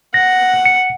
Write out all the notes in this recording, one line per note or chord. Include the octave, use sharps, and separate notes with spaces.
F#5 A#6
C#7